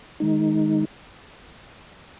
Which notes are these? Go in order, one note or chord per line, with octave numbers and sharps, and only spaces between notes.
D#3 G#3 D#4